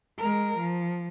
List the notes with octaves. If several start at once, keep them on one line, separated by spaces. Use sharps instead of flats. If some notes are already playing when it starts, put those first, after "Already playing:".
G#3 A#4
F3